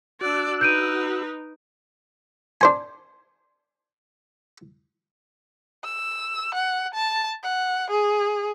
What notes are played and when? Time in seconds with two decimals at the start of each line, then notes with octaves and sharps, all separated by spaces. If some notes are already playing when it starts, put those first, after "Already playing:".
0.21 D4 F#4 D5 E6 F#6
0.61 D#4 B4 G6 D7 D#7
2.61 D4 C5 G#5
5.84 E6
6.54 F#5
6.94 A5
7.43 F#5
7.90 G#4